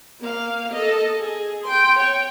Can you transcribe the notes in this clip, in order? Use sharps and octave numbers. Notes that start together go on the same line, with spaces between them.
A#3 F5
A4 D#5
G#4
G5 C6
C#5 G5